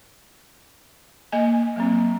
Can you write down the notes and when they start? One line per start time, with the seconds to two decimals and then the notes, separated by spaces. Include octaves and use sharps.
1.32 A#3 D#5 G#5
1.76 F#3 A#3 C4